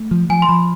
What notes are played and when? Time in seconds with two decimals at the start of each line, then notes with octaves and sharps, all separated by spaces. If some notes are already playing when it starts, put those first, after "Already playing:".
Already playing: A3
0.11 F3
0.30 F3 G#5
0.42 C6
0.49 F3 B5